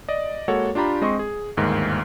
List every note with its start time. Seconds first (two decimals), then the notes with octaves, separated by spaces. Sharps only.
0.08 D5 D#5
0.48 G#3 A#3 F#4 A4 C#5 F#5
0.75 D4 F4 G4 A#5 B5
1.01 G#3 C4 D#5 C6 C#6
1.19 G#4
1.57 G1 D#2 G#2 A#4